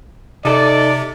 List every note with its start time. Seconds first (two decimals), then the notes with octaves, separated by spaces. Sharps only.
0.45 C3 D#4 A4 D5